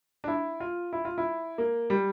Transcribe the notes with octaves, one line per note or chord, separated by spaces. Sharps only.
D4
E4
F4
E4
F4
E4
A#3
G3